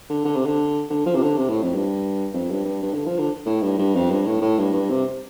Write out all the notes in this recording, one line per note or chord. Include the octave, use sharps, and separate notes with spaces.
D3
D3
C3
D3
D3
F3
C3
D3
C3
A2
F2
G2
F2
G2
G2
G2
D3
F3
D3
A2
G2
G2
F2
G2
A2
A2
G2
G2
C3